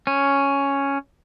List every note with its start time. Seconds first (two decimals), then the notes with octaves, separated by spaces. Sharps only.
0.07 C#4